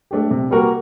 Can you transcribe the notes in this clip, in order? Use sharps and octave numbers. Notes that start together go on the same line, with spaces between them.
A3 D4 G4
C3
G3 A#3 F#4 A#4